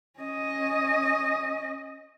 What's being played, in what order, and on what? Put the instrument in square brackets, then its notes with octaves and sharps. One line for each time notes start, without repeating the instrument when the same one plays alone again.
[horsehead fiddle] C#4 D#5